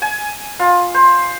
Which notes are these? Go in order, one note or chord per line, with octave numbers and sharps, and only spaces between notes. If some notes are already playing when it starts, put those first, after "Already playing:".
G#5
F4
C5